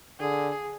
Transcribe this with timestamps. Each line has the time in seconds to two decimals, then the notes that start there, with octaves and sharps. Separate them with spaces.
0.19 D3 G#4